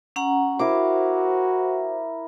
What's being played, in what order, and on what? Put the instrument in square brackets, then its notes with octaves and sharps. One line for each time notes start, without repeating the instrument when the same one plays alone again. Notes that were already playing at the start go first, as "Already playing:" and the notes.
[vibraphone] C#4 F#5 A#5
[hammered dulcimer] E4 A#4 D6 [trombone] F#4 [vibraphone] C5